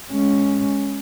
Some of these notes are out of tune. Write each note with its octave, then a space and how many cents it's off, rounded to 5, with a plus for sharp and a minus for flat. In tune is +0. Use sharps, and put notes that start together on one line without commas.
G#3 +5 C#4 +0